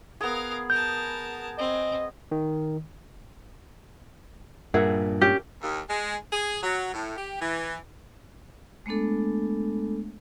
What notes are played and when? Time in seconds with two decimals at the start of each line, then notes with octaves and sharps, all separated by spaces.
0.21 B3 G#4 A#4 F5
0.70 A#4 A5 G6
1.59 C4 D#5
2.31 D#3
4.74 G2 A#2 G#4 A#4 E5 F#5
5.21 C#4 G4
5.62 D#2
5.88 G#3
6.31 G#4
6.63 F#3
6.93 A2
7.16 G4
7.41 E3
8.86 G#3 A3 B3 D4 A4